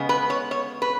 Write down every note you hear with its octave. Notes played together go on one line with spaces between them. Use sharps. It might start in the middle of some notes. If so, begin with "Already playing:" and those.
Already playing: C#3 G#3 B3
B4
C#5
C#5
B4